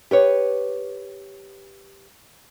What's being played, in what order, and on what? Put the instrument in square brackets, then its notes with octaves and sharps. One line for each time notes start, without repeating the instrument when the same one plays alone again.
[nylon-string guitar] G4 B4 C#5